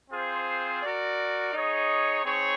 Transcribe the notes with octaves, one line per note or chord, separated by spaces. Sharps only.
C4 F4 G#4 C5
F#4 A#4 D5
D#4 G#4 C#5
C4 D#4 G#4 C#5